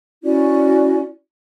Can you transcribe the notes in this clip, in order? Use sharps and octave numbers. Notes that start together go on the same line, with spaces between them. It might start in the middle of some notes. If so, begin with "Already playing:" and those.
C#4 E4 F#4 D5